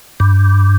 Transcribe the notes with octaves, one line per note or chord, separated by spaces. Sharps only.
G2